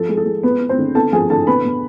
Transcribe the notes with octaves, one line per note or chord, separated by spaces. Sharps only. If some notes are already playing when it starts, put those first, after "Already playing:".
Already playing: F3 A4
G#3
A4
G#3
B3 B4
B3
C4 C5
D3
B3 A4 A5
F3 G#4 G#5
D3 A4 A5
B2 B4 B5
B2